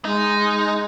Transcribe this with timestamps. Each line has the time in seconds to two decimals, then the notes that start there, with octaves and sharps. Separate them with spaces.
0.05 G#3 D#4